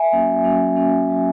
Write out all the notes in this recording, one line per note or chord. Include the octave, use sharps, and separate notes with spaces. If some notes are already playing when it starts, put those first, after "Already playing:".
Already playing: E5 G#5
F#3 A#3 C#4 F#4
F#3 A#3 C#4 F#4
F#3 A#3 C#4 F#4
F#3 A#3 C#4 F#4